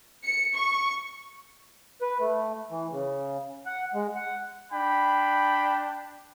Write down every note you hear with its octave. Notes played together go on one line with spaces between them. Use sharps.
C#7
C#6
B4
A3
E3
C#3
F#5
G#3
F#5
D4 G5 B5